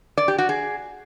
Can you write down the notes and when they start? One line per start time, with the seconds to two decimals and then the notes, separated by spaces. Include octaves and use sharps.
0.18 D5
0.28 G4
0.38 F#4
0.49 G#4